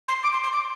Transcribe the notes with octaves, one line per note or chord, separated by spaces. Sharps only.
C6
D6
C6
C6
D6